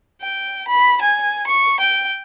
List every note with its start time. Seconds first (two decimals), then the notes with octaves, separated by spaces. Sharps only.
0.22 G5
0.68 B5
1.02 G#5
1.47 C#6
1.80 G5